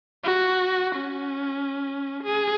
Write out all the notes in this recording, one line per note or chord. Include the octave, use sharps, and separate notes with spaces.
F#4
C#4
G#4